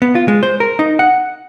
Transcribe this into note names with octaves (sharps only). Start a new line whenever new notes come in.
B3
F4
G#3
C5
A#4
D#4
F#5